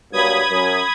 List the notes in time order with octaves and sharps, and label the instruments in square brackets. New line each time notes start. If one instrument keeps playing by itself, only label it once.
[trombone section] G2 F#3 A#3 [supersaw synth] B5 D#6 G#6
[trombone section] F#2